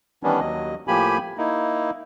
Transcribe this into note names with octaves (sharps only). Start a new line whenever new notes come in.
D#3 E3 G3 B3 C#4 D4
D#2 F#3 D#5
A2 F3 A#3 G4 G#5 B5
A#3 D#4 E4